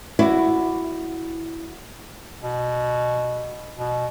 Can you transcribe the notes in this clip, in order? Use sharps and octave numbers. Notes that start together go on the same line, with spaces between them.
E4 F#4 D5
B2
B2